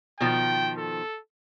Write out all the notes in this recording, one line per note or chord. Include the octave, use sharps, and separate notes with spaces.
B2 D#3 F3 G5
A4